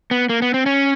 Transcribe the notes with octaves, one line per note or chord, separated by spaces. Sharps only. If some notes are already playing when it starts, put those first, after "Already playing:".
B3
A#3
B3
C4
C#4